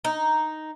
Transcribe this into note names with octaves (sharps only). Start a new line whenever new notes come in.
D#4